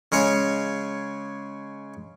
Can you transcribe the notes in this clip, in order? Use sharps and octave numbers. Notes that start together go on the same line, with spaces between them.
C#3 G#3 C#5 G#5